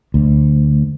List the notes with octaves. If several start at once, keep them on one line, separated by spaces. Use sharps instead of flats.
D2